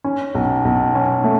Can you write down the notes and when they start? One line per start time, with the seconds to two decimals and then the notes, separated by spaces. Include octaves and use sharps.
0.04 C#4
0.35 B1
0.65 B1
0.95 C#4
1.24 A3